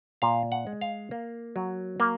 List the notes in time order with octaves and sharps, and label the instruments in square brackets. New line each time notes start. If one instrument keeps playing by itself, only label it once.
[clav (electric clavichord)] A#2 F5
F#5
G#3
F5
A#3
F#3
A#3